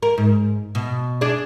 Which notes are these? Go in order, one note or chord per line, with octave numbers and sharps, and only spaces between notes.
A#4
G#2
B2
D4 G#4 D5